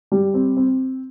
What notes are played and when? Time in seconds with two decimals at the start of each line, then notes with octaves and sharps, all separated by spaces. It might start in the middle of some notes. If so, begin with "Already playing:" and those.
0.12 G3
0.34 C4
0.57 C4